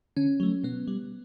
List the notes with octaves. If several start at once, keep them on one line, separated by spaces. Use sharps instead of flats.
D3 C#4
F#3 A3
B2 B3
G3